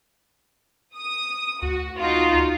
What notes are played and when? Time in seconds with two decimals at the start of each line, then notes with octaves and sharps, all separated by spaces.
0.97 D#6
1.62 D2 F#4
1.97 D#4 F4 F#4